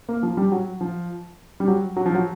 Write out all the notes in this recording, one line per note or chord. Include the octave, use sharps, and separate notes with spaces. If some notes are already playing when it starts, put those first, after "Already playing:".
A#3
F3
G3
F#3
F3
G3
F#3
F#3
F3
F#3